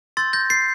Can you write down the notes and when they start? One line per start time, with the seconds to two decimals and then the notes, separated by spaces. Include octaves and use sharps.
0.17 C6 E6 G6 A6
0.33 G6 A#6
0.50 A6 C7